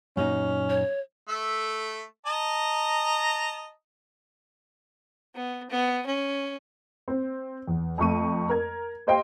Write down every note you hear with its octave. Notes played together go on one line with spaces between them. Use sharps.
F#2 A#2 C#4 D#4
C#5
A3 E5
D#5 A5 A#5
B3
B3
C#4
C4
E2
F2 A3 C#6 D#7
A#4 G#6
G4 C5 D#5 F5 G5 C6